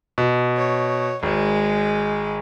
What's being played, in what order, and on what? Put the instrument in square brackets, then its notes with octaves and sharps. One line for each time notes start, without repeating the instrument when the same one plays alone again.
[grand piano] B2
[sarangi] C#5
[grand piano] G#1 [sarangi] G#3